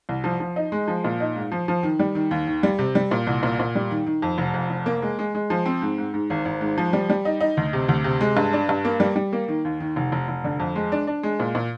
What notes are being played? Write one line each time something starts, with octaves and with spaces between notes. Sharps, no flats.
C2
F3
F3
D#4
G#3
F3
A#2
D#4
G#2
F3
F3
D#3
G3
D#3
D#2
D#3
G3
C3
G3
A#2
C2
A#2
A#2
G3
D#3
D#3
F2
F1
F2
F1
A#3
G#3
G#3
G#3
F3
C4
G#2
G#2
G#2
G#1
G#1
G#2
F3
G3
G3
D#4
D#4
D2
C3
D2
C3
G#3
G2
D4
G2
A#3
G3
G3
A#3
D#3
D#2
D#3
F1
F1
F1
D3
F2
G#3
D4
D4
G#3
A#2
A#2